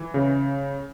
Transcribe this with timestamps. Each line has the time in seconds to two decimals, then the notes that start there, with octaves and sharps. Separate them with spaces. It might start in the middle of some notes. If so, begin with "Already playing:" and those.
Already playing: E3
0.14 C#3